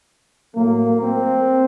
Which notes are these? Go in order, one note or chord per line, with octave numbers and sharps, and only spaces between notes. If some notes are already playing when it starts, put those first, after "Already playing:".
A2 F#3 A3 A#3
C4